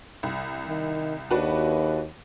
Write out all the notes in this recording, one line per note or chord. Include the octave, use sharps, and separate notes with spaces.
C2
D#3
D#2 D4 F#4 B4